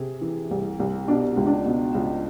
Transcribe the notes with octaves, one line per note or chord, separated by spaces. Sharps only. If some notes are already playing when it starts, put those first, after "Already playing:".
Already playing: C3 G#4
E3
C2
C2
B2 D4
C#2
D4
B2
C#2